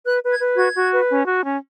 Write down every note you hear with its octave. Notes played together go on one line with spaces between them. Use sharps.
B4 F#6
B4
G#6
B4
F#4 G#6
F#4
B4
C#4
F#4
C#4